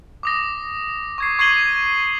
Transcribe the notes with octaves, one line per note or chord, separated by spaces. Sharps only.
D6 D#6 A#6
C#6 G#6 C7
C#6 G#6 C7 D#7 F#7 G7